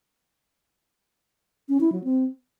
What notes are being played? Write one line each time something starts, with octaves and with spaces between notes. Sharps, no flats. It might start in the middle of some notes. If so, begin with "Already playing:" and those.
C#4
E4
F#3
C4